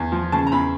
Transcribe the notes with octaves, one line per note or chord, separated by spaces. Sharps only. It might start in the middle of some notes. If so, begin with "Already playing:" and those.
Already playing: E2
F3
C#3 A5
A#5
E2 B5